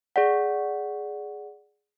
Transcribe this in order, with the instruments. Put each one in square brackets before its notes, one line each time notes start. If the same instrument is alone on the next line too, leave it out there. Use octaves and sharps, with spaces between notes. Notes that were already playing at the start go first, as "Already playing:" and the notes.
[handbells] G#4 D5 F#5